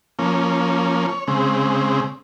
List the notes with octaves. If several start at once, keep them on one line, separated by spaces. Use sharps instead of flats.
F3 A#3 C#4
C#5
C#3 G#3 C4